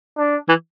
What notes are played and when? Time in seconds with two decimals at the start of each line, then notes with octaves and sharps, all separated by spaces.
0.18 D4
0.49 E3